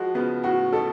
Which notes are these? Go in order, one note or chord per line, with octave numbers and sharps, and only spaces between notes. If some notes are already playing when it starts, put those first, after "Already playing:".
Already playing: F3 G#3 F#4
C#3 F3 B3
A2 F#4
B2 A4